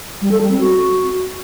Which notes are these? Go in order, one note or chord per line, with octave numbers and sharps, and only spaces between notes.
G3
A4
G3
C4
F#4